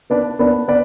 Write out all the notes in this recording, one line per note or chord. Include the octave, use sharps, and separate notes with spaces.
B3 D4 B4 D5
B3 D4 B4 D5
B3 B4 D5